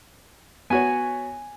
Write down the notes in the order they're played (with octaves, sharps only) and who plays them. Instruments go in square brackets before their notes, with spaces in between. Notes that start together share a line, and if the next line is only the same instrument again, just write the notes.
[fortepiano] B3 F#4 C#5 [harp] G#5